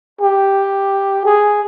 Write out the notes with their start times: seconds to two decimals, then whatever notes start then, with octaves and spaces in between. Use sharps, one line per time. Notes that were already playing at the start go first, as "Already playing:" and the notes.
0.21 G4
1.25 G#4